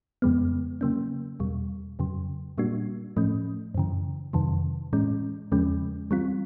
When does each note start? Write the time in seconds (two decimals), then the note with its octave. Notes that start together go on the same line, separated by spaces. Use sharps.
0.22 F2 C#3 F3 G#3 B3
0.81 C#3 F#3 A#3 C#4
1.40 E2 B2 G3
1.99 F2 C#3 F#3
2.58 A#2 G3 A#3 D4 F#4
3.17 A2 F3 A3 C#4
3.75 F#2 C#3 E3
4.33 F2 C3 D#3 F#3
4.93 A2 E3 G#3 C#4
5.52 E2 C#3 F3 G#3 C#4
6.11 E3 G3 C4 F4